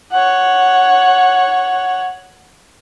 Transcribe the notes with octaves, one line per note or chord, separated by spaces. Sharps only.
C#5 F#5